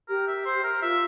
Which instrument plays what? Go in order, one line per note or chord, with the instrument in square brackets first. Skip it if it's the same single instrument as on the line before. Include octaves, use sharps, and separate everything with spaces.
[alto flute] G4 [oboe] A#4
[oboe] E5
C5
A#4
[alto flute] F4 [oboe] E5